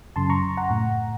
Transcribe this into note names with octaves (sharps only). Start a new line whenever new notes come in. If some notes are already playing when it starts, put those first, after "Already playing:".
F#2 C#3 A5 C6
A#5 C#6
F#5 A#5
A2